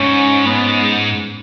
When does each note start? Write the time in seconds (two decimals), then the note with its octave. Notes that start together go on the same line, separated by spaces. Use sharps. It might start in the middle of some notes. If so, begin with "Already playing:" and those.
Already playing: G#2 C#4
0.45 B3